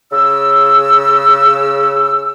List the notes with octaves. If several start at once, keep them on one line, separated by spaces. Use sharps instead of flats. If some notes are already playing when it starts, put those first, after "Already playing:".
C#3 E6